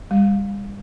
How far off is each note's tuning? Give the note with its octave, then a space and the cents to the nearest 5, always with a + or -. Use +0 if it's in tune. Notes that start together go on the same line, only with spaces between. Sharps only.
G3 +40